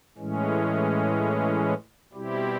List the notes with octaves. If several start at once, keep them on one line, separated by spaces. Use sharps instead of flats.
A2 E3 G#3 C#4
B2 G3 C4 E4 G4